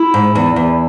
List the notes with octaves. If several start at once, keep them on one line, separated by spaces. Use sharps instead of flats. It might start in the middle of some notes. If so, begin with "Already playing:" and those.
Already playing: E4
G#2
E2
E2